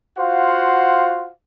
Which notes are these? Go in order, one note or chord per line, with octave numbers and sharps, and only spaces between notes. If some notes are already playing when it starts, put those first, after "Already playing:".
F4 F#4 C5 F5 F#5